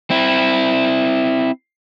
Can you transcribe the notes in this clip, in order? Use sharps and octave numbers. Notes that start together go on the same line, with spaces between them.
C4 E4